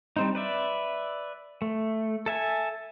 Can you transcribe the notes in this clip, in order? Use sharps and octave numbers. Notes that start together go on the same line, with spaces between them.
G3 C4 D#4
B4 D5 E5
A3
A4 E5 G#5